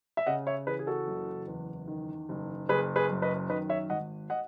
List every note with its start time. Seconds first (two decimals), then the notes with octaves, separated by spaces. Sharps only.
0.17 E5
0.27 C#3 D#5 F#5
0.47 C#5 E5
0.67 E3 G#4 B4
0.79 G#4
0.87 F#4 A4
1.07 F#1
1.48 E2
1.88 D#3
2.29 F#1
2.69 F#1 G#4 B4
2.96 G#4 B4
3.10 F#2
3.22 B4 D#5
3.50 D#3 B4 D#5
3.69 C#5 E5
3.90 G#1 D#5 F#5
4.30 D#5 F#5